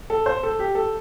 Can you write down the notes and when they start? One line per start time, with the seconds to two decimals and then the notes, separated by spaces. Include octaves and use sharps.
0.10 A4
0.26 C5
0.43 A4
0.59 G4
0.75 A4